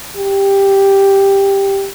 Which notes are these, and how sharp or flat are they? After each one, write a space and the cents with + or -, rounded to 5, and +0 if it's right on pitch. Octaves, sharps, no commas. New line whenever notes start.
G4 +5